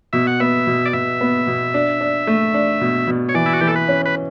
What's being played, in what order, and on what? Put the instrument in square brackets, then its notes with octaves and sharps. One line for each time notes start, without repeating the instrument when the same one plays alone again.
[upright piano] B2 [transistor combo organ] E5
[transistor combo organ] F#5
[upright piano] B3 [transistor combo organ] E5
[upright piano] B2
[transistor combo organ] D5
[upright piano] B2 [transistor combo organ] E5
[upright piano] B3
B2
D4
D4
A3
D4
B2
B2
[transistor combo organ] C#5
[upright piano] E3 [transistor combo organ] D5
[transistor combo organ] E4
F#4
[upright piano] E3 [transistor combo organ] G4
[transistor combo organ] A4
B4
[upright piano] C#4
[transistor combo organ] B4